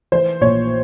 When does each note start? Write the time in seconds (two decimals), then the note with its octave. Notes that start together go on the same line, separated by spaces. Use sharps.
0.12 E3 C5
0.41 A#1 C#5